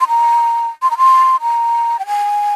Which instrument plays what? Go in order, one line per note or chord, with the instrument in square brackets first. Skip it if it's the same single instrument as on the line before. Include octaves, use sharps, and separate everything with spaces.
[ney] C6
A#5
C6
A#5
C6
A#5
G5
G#5